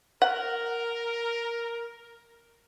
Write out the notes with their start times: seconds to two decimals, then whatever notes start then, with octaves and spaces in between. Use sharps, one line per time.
0.22 A#4 F#5